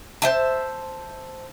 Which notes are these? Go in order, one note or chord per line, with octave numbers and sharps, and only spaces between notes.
C5 E5 A5